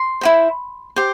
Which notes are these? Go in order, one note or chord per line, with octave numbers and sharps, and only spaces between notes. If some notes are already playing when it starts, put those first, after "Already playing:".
Already playing: C6
E4 G4 C5
G4 C5